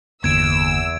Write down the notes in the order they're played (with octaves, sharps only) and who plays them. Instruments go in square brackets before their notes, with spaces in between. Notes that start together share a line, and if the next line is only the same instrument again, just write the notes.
[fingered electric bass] G1 D3 A#3 [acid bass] E2 [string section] E6 [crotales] G#6 D7